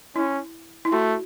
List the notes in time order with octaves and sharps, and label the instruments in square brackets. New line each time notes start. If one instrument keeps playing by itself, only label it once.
[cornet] C#4 [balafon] E4
[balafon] E4
[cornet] A3 [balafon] F#4